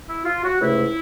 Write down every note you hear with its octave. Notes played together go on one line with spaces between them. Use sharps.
E4
F4
F#4
C#2 C3 F3 A3 E4